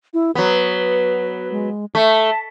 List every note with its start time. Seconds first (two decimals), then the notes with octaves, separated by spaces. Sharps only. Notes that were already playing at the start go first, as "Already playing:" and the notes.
0.14 E4
0.35 F#3 B3 B4
1.52 G#3
1.95 A3 A5